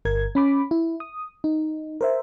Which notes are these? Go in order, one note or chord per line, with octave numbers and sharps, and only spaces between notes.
G1 A#4 G#6
C#4 B5 D6
E4
D#6
D#4
A#4 C5 E5